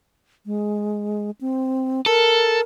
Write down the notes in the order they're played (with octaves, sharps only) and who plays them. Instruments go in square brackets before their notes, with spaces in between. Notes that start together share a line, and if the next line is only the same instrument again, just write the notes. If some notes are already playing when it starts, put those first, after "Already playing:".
[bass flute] G#3
C4
[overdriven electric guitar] A4 [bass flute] A#4